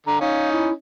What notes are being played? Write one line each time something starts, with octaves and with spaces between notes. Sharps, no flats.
D3 A#5
C#4 D#4 F5
E4